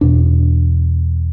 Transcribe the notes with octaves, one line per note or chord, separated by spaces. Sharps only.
E2 B2 D4